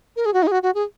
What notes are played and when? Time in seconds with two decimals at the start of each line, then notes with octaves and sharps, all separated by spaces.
0.16 A#4
0.26 G#4
0.34 F#4
0.43 D#4
0.47 G#4
0.52 F#4
0.63 F#4
0.75 G#4